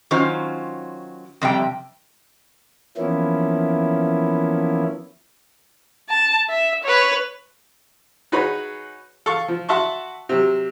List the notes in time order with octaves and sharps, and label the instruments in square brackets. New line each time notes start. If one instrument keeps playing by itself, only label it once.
[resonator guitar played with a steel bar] D#3 F#3 C#4 F4 C5
F2 C3 G3 G5
[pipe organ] E3 F3 A#3 B3 C#4 E4
[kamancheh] A5
E5
B4 C#5
[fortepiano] D#4 F#4 G#4 B4 C#5 B5
A4 F5 C#6
F3
F#4 E5 F#5 A5 C6 C#6
C3 F#3